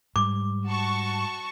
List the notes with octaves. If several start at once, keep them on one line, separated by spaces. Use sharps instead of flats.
G#2 G3 D6
F#4 A5 C#6